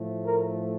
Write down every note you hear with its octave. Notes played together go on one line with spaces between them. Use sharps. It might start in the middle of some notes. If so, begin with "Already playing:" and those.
Already playing: A2 F3 A3
A#4